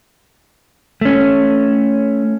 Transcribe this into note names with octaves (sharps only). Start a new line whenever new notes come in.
A3 C#4